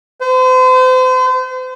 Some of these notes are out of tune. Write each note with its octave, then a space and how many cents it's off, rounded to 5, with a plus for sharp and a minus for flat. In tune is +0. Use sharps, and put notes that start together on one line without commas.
C5 -40